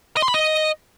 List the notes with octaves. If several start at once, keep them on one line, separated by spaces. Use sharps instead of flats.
D#5
C6
B5
D#5